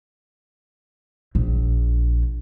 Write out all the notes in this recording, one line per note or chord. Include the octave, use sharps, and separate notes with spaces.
A#1